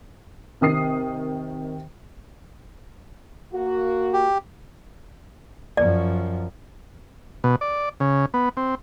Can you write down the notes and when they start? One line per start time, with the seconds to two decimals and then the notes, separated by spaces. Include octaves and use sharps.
0.61 C3 D#3 D#6 C7
3.53 A#3 F#4
4.13 G4
5.77 F#2 F3 D5
7.44 B2
7.61 D5
8.00 C#3
8.34 B3
8.57 C4